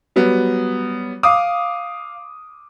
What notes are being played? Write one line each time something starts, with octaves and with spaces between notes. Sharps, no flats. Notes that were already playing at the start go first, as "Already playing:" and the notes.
F#3 G3 B3
F5 D6 D#6